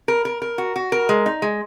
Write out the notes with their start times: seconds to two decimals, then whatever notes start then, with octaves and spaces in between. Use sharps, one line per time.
0.08 A#4
0.25 A#4
0.42 A#4
0.58 F#4
0.76 F#4
0.92 A#4
1.09 G#3
1.26 D#4
1.42 G#3